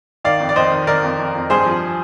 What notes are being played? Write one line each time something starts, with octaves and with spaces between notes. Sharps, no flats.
D#3 D5 F5
F2
D5
F2 C5 D#5
D#3
D#3 A#4 D5
F2
F2
F2
G2 G#4 C5
F3